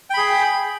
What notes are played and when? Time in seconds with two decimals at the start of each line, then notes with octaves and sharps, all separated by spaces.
0.10 G5
0.14 B5
0.17 G#4